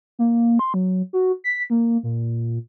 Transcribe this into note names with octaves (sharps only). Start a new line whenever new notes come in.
A#3
C6
F#3
F#4
B6
A#3
A#2